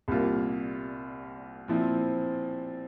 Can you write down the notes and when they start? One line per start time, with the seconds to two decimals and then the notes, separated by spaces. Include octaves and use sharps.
0.08 C2 A#2 G3 A#3 F4
1.68 A#2 F3 C4 E4